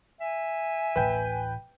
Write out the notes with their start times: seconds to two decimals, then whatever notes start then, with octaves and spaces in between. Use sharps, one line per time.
0.21 E5 G#5
0.96 D1 A1 B4 G5